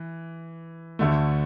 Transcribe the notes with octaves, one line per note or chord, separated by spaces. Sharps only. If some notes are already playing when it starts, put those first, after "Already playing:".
Already playing: E3
D2 D3 A3